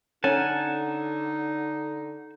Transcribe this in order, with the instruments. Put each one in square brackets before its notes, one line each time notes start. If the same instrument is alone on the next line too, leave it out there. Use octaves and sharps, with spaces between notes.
[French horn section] D3 A4 [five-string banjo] C#4 [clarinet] D#4 [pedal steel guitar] F#5 G#5 A5